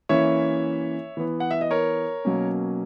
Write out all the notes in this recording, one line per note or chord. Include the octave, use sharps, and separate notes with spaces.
E3 A#3 C#4 C#5 E5
E3 B3
F#5
E5
D#5
A#4 C#5
B2 F#3 A#3 C#4